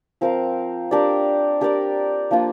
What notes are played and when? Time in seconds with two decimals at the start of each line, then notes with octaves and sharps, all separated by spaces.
0.21 F3 C4 A#4 F5
0.91 D4 G4 A#4 D5
1.61 D4 G4 A#4 D5
2.31 F3 A#3 D4 F4